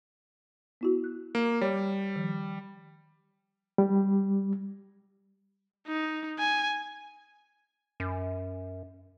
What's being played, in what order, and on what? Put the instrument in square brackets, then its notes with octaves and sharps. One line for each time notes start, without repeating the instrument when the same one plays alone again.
[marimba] B3 E4 F#4
F#6
[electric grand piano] A#3
[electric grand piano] G3 [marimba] C#5
[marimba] D#3 F3
[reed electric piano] G3
[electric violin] D#4
G#5
[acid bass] F#2